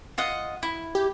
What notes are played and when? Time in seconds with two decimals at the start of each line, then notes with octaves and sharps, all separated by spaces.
0.18 F4 D#5 F#5
0.63 E4
0.95 G4